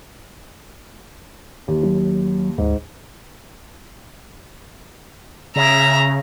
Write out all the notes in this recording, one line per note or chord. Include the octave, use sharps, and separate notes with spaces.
D#2
F#3
D2 G#2
C#3 E5 A#5